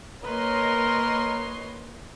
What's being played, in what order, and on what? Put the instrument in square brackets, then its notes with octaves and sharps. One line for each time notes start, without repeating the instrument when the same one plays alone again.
[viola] A#3 B4 [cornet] A#4 [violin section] C#5 D#5 C6